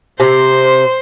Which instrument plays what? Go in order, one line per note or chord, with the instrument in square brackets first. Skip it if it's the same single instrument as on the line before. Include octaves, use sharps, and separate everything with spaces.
[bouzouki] C3 [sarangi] C5